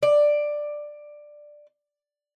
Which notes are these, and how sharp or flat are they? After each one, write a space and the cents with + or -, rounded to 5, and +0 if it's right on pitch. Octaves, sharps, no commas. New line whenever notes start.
D5 +10